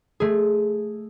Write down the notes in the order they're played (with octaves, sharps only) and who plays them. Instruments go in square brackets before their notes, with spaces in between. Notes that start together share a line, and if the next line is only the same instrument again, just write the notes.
[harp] A3 G#4